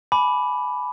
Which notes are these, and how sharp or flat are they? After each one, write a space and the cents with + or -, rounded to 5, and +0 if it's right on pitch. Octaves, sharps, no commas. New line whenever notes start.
G#5 +30 B5 +0 D6 +0